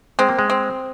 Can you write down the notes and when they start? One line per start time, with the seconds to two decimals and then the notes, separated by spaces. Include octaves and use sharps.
0.19 G#3 C4
0.29 A#3
0.39 G#3
0.50 C4